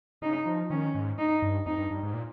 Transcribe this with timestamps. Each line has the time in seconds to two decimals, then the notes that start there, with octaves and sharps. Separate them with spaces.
0.22 C#3 D#4
0.46 F3
0.70 D#3 C#4
0.95 G#2
1.18 D#4
1.42 G2
1.66 F2 D#4
1.78 G2
1.91 G2
2.03 G#2
2.14 A#2